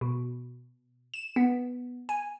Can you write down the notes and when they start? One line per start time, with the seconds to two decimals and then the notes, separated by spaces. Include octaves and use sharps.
0.01 B2
1.14 E7
1.36 B3
2.09 G#5